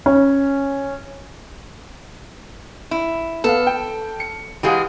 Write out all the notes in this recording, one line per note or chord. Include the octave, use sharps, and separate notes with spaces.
C#4
E4
B3 A4 F5
G5
C#7
E3 G#3 G4 G#4 F5 F#5